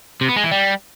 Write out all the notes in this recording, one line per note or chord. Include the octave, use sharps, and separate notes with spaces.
C3
B3
G#3
E3
G3